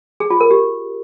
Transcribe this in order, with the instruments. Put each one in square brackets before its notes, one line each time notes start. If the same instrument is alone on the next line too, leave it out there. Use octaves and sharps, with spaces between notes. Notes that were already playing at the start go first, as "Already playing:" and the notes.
[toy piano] G#4
F4
A#4
G4